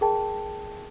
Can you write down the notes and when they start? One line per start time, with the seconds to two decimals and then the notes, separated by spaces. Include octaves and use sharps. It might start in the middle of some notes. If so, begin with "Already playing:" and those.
0.01 G#4 A#4 G5 A5